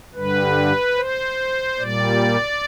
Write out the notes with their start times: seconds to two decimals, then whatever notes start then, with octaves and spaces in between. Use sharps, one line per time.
0.14 G2 D3 G3 B4
0.97 C5
1.79 A#2 G3 D5